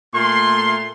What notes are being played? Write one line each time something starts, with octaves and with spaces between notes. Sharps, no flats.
A#2 A3 C6